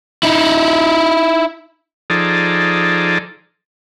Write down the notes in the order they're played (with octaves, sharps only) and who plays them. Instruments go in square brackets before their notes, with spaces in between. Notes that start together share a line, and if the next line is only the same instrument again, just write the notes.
[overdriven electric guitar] D#4 E4
[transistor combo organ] F3 D#4 G#4 A4 D5